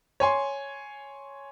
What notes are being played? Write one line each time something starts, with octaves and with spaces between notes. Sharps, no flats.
C#5 G#5 C6